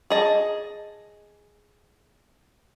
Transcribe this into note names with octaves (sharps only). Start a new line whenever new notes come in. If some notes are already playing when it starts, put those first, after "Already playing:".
G#4 D#5 A5